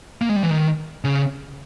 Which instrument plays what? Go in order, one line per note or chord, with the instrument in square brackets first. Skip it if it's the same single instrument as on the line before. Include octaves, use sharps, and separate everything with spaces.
[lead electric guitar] A#3
G#3
G3
E3
D#3
C#3